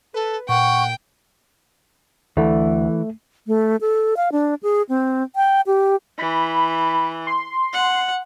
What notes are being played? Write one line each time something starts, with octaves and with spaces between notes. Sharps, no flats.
A4 B4
A#2 F#5 G5 C#6
D2 E3 A3
A3
A4
F5
D4
G#4
C4
G5
G4
E3 B5
C6
F#5